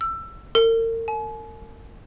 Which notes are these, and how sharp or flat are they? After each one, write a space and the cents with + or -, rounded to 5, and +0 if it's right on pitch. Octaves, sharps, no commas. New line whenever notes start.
E6 +20
A#4 -40
G#5 +45